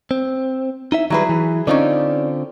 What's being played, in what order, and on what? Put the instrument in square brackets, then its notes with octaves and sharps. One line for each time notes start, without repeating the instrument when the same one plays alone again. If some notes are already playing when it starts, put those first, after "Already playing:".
[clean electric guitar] C4
D#4 E4 E5
[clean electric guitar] D#3 G3 B4 [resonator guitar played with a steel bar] F#3 E4 G#4
[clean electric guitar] E3
[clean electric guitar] D3 C4 F4 [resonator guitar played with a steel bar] C#4 D#4 D5